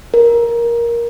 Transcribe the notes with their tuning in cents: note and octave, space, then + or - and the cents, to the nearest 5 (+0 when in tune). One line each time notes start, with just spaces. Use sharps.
A#4 +15